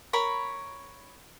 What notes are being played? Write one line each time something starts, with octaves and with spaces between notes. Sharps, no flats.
A#4 C#5 B5